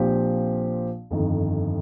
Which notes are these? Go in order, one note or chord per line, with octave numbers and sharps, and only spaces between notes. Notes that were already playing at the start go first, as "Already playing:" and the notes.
Already playing: A#1 A#2 F3 C4 G4
G1 F2 D#3